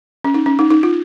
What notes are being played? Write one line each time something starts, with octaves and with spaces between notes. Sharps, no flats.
C#4
D#4
C#4
D#4
D#4
F4